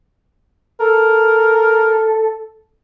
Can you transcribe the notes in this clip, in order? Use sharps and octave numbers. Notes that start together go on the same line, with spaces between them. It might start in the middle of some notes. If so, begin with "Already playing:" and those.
A4 A#4